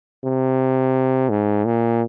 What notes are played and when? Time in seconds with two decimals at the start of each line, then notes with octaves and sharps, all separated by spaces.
0.24 C3
1.30 G#2
1.65 A#2